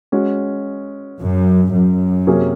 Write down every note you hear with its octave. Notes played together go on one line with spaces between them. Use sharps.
G#3 C#4 F#4
F#2
F#2
C3 F#3 A#3 C#4 G#4